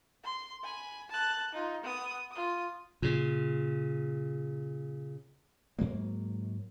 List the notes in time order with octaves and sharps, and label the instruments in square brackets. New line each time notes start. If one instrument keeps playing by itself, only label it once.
[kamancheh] C6
G#5 B5
A5 F#6
D#4 F4
B3 D#6
F4 D#6
[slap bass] A#2 C#3
G#2 F#3 A#3